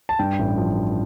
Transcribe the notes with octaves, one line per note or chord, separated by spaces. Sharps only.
A5
G2 G5
A1
F3